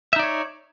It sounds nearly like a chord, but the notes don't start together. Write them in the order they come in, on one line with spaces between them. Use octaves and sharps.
E5 D#4 D5 C#5